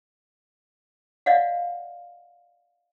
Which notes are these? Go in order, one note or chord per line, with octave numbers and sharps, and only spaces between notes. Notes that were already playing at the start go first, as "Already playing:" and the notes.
D5 D#5 F5 F#5